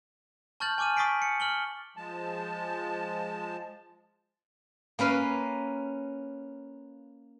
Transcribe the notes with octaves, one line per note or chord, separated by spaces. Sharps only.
A5 C#6 F6 G6 A6 F#7
G#5 C#6 D6 F6 D#7
C#6 D#6 A6 B6 C7 D7
C#7
F6 F#7 G7
F3 G#3 A5
A#3 C#4 B4 F5